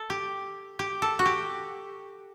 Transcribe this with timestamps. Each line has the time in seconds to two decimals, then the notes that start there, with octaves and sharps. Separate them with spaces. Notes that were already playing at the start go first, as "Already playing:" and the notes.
Already playing: A4
0.10 G4
0.79 G4
1.02 A4
1.19 F#4
1.26 G4